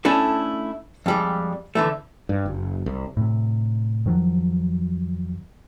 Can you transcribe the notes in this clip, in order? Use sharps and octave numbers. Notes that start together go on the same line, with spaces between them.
A3 C#4 D4 E4 A4
F2 G3 G#3
D3 E3 A3
G2
F#1
C2
A2 C3
F2 D#3 F3 F#3